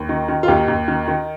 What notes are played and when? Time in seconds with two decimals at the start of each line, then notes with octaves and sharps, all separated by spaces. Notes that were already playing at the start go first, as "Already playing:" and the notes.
Already playing: D#2
0.09 D#3
0.28 D#3
0.43 F4
0.48 D#2 D#4 G4
0.68 D#2
0.88 D#3
1.07 D#3